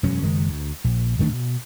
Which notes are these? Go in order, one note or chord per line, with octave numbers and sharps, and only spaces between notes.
E1 F#2 F#3 C#4
F#1 D#3 G#3
D2
A#1
D1 D#3 A3 D4
B2